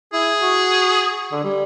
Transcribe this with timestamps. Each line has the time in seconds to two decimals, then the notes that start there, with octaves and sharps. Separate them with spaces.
0.13 E4 G#4
0.42 F#4
1.32 D3
1.44 G3